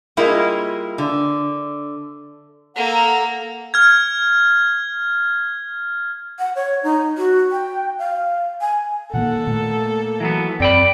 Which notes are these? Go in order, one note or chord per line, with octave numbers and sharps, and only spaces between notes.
G3 G#3 A#3 E4 F4
D3
A#3 A4 F#5 A#5
F6 G#6
F#5
C#5
D#4
F#4
G5
F5
G#5
A#2 D#3 A#3 A4 F#5
A#2 A3 A#3
E3 F#3 B3
F#2 C4 D5 G5 B5